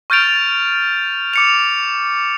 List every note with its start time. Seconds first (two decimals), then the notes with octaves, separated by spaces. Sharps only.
0.10 C#6 F6 G6 A6 D7 F7
1.34 D6 C#7 F7